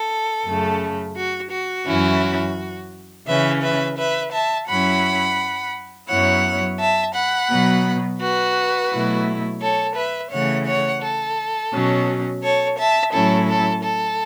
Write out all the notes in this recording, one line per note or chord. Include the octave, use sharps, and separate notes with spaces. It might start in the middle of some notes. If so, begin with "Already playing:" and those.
Already playing: A4
F#2 C#3 A3
F#4
F#4
F#2 E3 C#4 E4
C#3 E3 C#4 B4 E5
B4 E5
B4 E5
E5 A5
F#2 F#3 C#4 E4 F#5 B5
F#2 F#3 B3 E4 C#5 F#5
E5 A5
F#5 B5
B2 F#3 B3
F#4 B4
B2 F#3 A3 E4
A4 C#5
B4 E5
C#3 E3 A3 C#5 F#5
C#5 F#5
A4
B2 F#3 C#4
A4 C#5
E5 A5
A2 F#3 C#4 E4 A4
A4
A4